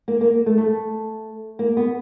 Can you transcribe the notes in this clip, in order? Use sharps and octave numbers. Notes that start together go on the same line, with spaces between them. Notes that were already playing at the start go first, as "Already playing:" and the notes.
A#3
A#3
A3
A3
A#3
B3